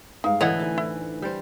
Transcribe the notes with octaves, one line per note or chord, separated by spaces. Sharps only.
G2 G#3 D#4 F5
A2 D3 E3 C#5 D#5 F#5
D2 D#4 G#5
E4
G3 C5